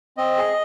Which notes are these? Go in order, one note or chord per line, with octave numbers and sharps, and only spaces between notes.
C4 D#5
G#4